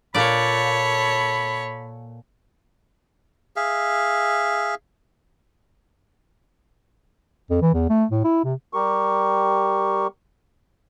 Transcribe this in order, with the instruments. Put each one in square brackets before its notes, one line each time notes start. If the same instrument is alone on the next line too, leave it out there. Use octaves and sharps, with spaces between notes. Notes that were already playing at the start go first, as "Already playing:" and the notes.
[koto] A#2 D5 [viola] A4 C#5 [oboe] B5
[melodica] G#4 E5 F5
[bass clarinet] F2
E3
E2
A3
A2
E4
C3
[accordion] G3 G4 A#4 C#6